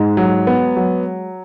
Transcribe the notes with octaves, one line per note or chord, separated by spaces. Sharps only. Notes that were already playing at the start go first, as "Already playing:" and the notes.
Already playing: G#2 G#3
F#3
B3
F#3